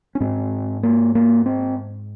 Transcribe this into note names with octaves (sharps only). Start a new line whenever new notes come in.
C#4
G#2 C4
A#3
A#3
C4